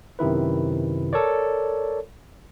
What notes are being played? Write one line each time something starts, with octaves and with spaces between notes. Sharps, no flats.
F#2 C3 D#3 E4 B4
A4 A#4 C#5 D5